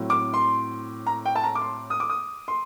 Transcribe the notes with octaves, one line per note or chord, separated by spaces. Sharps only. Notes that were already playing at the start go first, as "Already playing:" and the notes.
Already playing: A2 F#3 C4
D6
C6
A#5
G5
A5
A#5
D6
C6
D#6
D6
D#6
C6